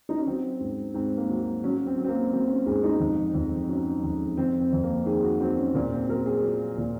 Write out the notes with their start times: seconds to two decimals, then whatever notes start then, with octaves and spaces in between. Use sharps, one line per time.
0.09 D#4
0.18 C#4
0.27 F#3 C4
0.60 G#2
0.94 G#2 C4
1.17 A#3
1.29 F#3
1.64 F#3 C#4
1.86 C4
1.97 F#3
2.04 C4
2.09 A#3
2.32 F#3 C4
2.48 C#4
2.66 G#2 G#4
2.83 D#4
3.00 F2
3.34 F2
3.68 F#3 C#4
4.04 F2
4.37 F2 C4
4.60 C4
4.72 F2
4.83 A#3
5.06 D#3 G#4
5.23 F#4
5.40 F#3 C4
5.57 C#4
5.75 A#2 A#3
5.92 C4
6.08 F#3 A#4
6.26 G#4
6.43 F#3 F4
6.78 A#2